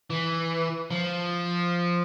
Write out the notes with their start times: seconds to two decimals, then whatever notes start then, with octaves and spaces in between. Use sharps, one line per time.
0.10 E3
0.91 F3